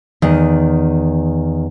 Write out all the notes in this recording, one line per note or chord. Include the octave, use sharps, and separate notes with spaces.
E2 D#3